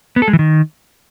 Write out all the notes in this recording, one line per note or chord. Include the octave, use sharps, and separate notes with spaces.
B3
A4
G#3
E3
D#3